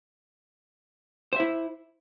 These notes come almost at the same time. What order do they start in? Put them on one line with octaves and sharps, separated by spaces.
C5 E5 E4